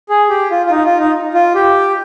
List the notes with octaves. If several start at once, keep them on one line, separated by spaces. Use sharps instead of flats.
G#4
G4
F4
F4
D#4
F4
D#4
F4
G4